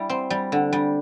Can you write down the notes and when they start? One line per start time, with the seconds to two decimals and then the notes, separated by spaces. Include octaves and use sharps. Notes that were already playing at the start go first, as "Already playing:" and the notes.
Already playing: G3 E4
0.10 C4
0.30 G3
0.52 D3
0.73 G3